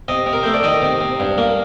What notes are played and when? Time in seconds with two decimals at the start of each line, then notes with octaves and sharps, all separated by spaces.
0.08 C3 D#5
0.26 C3
0.33 A#4
0.43 A3 C5
0.54 D5
0.63 D#3 D#5
0.82 C3
1.00 C3
1.20 G2
1.38 A#3